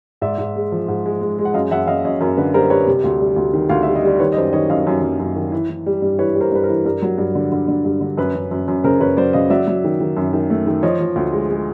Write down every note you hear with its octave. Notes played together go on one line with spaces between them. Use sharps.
G#2 D5 E5
G#2
G#3
F3
G#2
G#3
G#3
G#3
F#5
F#2 D#5 F5
F#2 E5 F#5
F#2 D#5 F5
F#2 C#5 D#5
F#2 A#4
D3 B4
G3 A#4 C5
G3 B4 C#5
C3
D2
G3
D2
D#3
D2 F5
G3 E5
D#5
G3 D5
D#3 B4 C#5
D#5
F#2 C5 D5
D#3 C#5 D#5
F#2 D#5 F5
F#2
F#2
F#2
D#3
E3
E3
G3
G2
E3 B4 C#5
G3
A#4 C5
G2 B4
A#4 C5
E3
G2 A#4
F#3
G2
D3
D3
D3
G2
D3
F#2 B4
F#2
F#2
F#2
C#3 A#4 C5
F#2 B4 C#5
F#3 C5 D5
C#3 D#5 F5
F#3 D5 E5
F#3
D#3
D#3
F#2
D#3
A3
D#3
F3 C#5 D#5
F3
D2
G#3
G#3